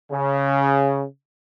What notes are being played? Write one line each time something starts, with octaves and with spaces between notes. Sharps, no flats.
C#3